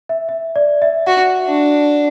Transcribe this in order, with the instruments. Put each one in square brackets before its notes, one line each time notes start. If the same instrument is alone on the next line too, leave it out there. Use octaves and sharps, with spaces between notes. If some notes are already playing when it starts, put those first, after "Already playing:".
[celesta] E5
E5
D5
E5
[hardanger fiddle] F#4 [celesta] F#5
[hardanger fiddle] D4